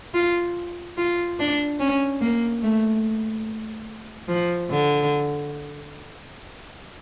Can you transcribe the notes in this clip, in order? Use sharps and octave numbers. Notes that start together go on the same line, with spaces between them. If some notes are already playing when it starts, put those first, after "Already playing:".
F4
F4
D4
C#4
A#3
A3
F3
D3